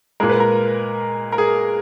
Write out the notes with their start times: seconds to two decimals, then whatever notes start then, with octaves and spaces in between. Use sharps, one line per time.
0.20 A#2 G#3 A#4
0.29 B4
0.40 A#4
1.32 A#4
1.38 G#4